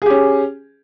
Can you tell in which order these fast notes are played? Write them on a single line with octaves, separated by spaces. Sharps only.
G#4 G4 C#4